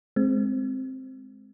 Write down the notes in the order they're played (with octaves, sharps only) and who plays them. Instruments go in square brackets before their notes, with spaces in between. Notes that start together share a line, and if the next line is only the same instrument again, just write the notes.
[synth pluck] G#3 C4